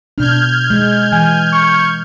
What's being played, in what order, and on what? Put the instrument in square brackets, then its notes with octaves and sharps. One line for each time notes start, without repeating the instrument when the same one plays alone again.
[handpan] B2 D4 [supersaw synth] F6 G6 G#6
[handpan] G#3
[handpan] E3 [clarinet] G#5
[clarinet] C#6